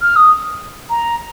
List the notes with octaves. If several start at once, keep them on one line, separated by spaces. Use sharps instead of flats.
F6
D#6
A#5